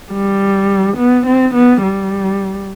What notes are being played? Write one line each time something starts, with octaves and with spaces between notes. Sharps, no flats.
G3
B3
C4
B3
G3